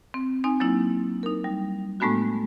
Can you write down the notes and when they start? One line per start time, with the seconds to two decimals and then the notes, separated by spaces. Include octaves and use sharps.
0.14 C4
0.44 C4 D#4 G#5
0.60 F#3 A#3 D4 E4
1.23 D#4 A#4
1.44 G3
2.00 A2 G#3 A3 B3 D4 F#4